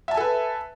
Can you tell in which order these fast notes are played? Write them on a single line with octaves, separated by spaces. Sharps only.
E5 A5 G#5 A4 B4